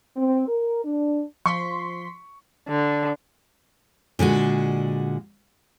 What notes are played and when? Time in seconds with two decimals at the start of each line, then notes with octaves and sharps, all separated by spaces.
0.17 C4
0.48 A#4
0.85 D4
1.46 F3 C6 C#6 B6
2.68 D3
4.19 A#2 D3 G#3 F#4